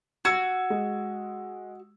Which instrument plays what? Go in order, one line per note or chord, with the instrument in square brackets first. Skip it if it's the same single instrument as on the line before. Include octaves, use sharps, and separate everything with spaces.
[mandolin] F#4 [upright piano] E6 G#6
[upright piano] G#3